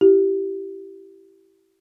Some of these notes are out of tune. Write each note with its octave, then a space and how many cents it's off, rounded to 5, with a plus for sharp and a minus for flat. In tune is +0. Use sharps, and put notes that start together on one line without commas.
E4 +15 G4 -15